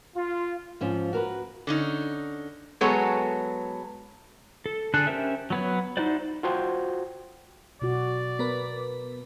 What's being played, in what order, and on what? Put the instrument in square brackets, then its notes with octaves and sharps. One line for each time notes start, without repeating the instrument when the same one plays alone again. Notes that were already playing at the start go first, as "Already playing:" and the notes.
[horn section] F4
[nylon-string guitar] G#2 F3 C#4 F4
F#4 A#4 B4
[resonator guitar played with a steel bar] D3 C#4 D#4
F#3 G#3 B3 A4 C#5
[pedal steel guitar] A4
D3 D4 G#4 A4 F#6
C#4 G4 A#4 C5 E5
F#3 B3 C#5
D#4 E4 F#4 C5 D5
[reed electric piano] F4 F#4 C5 G5
[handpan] B2 F#4 [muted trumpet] D5
[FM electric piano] B3 A#4 B4